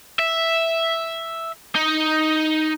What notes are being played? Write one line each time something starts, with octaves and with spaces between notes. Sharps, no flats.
E5
D#4